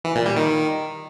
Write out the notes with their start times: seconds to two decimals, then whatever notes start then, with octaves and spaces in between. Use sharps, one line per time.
0.05 E3
0.15 A#2
0.26 G3
0.37 D#3